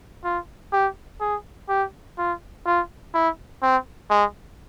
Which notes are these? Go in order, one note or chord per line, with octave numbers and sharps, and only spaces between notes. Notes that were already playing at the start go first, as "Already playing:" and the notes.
F4
G4
G#4
G4
F4
F4
E4
C4
G#3